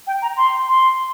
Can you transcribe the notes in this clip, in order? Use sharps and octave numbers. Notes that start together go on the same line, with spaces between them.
G5
A#5
C6
C6